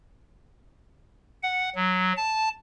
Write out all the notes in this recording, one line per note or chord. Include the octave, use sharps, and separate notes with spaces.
F#5
F#3
A5